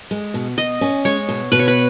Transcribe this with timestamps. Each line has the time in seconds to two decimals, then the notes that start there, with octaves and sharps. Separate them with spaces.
0.11 G#3
0.34 B2
0.58 B2 D#5
0.81 C#4
1.05 G#3 C#5
1.29 B2
1.52 B2 B4
1.59 C#5
1.68 B4